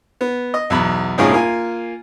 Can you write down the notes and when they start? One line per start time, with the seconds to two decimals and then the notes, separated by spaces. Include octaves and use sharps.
0.21 B3
0.54 D#5
0.70 B1 E2 B5
1.18 C2 A2 C#4 D#4 F4 G#4
1.32 A#3 F4 G#5